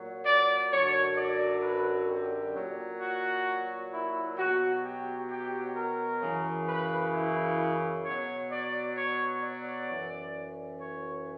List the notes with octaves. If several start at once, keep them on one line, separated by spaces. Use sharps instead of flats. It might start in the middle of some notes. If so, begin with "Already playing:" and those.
Already playing: A#2 F#3
D5
F#2 D3 F#3 C#5
D5
B4
G4
A#2 F#3
F#4
E4
B2 F#3 F#4
G4
G4
A#4
F#2 C#3 E3
B4
E4
B2 F#3 C#5
D5
C#5
D5
F#2 E3
C#5